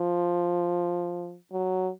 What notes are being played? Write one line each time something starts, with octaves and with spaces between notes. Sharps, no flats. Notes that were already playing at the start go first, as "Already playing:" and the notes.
Already playing: F3
F#3